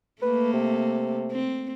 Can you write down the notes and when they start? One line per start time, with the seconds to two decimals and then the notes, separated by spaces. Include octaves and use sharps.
0.22 A3 A#3 B4
0.54 C3
1.32 C4